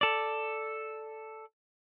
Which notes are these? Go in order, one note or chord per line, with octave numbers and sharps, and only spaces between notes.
A4 D5